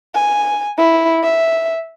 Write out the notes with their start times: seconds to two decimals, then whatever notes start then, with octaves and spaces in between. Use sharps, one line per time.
0.15 G#5
0.78 E4
1.24 E5